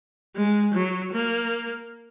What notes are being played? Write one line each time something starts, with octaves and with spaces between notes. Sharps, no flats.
G#3
F#3
A#3